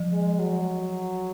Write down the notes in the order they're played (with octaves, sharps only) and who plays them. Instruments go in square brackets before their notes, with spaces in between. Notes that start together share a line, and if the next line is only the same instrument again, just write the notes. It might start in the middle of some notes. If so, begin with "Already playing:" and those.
Already playing: [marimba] F3
[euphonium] G#3
F#3